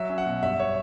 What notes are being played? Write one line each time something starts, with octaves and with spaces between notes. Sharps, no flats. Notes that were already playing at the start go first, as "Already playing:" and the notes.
Already playing: F#3 E5
C#4
F#5
B2
G2 E5
C#5